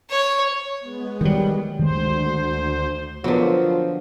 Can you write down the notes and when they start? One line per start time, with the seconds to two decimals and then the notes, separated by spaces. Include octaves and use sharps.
0.10 C#5
0.79 G#3 B3
1.21 D#3 F#3 G3
1.79 D2 D#3 G#3 C5
3.24 D3 F3 F#3 B3 A#4 B4